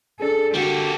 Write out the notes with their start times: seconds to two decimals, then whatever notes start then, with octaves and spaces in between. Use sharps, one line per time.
0.20 D4 G#4 A4
0.54 D3 A#3 F#4 G4 A4